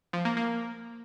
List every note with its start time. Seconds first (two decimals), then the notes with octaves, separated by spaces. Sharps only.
0.13 F3
0.25 A#3
0.37 A#3